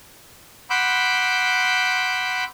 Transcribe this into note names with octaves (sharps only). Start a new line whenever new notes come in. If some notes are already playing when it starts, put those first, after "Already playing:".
F#5 B5 C6 D6 E6 G6